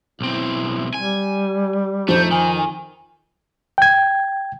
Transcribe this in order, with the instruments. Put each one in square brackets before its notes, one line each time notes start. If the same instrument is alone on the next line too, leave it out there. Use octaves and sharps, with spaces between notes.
[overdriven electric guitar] B1 C4 [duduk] E4
[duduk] G3 [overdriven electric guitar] G#5
[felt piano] F2 F3 [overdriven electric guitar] A3 [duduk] D#4 [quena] C5
[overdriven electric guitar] D#3 [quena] G#5
[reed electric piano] G5 G#6